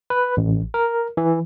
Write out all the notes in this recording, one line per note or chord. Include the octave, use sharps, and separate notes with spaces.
B4
A1
A#4
E3